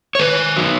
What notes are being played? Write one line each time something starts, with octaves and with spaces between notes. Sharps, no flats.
C#5
D#3 B4
F#3